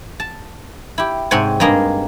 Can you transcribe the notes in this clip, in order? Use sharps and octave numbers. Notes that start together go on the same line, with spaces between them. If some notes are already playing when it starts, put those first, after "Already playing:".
A5
E4 G4
G#2 C3 C4 C#5 F#5 G#5
G2 G#3 A#3 G#4 D#5